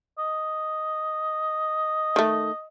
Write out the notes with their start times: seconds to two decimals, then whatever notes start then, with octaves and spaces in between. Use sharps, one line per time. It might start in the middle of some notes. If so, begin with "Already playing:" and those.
0.18 D#5
2.16 D#3 A3